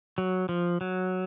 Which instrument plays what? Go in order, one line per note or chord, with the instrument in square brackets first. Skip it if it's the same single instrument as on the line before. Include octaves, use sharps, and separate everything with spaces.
[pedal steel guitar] F#3
F3
F#3